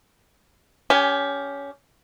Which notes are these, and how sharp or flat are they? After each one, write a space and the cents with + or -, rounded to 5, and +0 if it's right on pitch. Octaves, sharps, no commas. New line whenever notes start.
C#4 +20 G4 +0 G#5 +0